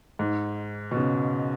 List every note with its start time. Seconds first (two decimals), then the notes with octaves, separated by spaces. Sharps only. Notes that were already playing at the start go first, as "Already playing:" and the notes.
0.19 G#2
0.91 B2
0.97 C#3